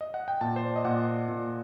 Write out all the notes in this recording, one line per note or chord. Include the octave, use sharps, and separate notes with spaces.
D#5
F#5
G5
A#2 A5
C5
D5
D#5
A#2 F#5
A#2